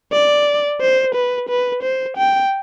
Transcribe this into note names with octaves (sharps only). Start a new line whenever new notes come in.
D5
C5
B4
B4
C5
G5